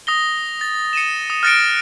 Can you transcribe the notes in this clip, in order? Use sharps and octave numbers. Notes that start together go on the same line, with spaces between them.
D#6 A#6 G7
A6
C#7 D#7 E7
D#6
F6 F#6 A6 A#6 C#7 D7